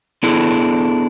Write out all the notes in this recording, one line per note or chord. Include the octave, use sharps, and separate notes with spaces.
B3 D4 E4 G#4 A4